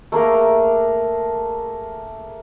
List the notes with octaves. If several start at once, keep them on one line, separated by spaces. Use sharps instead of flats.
A3 A#3 G#4 A#4